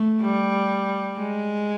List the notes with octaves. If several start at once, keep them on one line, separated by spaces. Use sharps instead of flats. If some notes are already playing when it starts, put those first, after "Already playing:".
Already playing: A3
G3
G#3